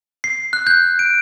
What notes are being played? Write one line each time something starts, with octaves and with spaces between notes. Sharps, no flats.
C7
F#6
G6
D7